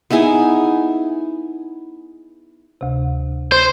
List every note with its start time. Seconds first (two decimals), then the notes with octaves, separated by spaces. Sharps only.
0.10 B3 D#4 E4 G#4
2.81 D2 C3
3.52 C5